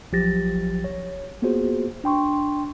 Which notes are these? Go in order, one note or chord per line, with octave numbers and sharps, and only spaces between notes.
A#1 F3 F#3 G4 A6 A#6
C#5
A#3 B3 F4 F#4 G#4 C5
D4 G5 C6 C#6